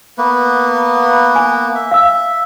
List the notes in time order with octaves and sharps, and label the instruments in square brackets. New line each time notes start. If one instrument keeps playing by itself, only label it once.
[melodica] A#3 B3 B4
[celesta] G#5
[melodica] E5
[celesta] F5 E6